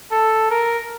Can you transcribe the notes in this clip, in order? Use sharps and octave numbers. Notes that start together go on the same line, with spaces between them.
A4
A#4